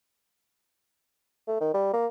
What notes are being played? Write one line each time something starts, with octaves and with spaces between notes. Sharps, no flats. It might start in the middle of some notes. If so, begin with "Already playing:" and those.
A3
D#3
G3
A#3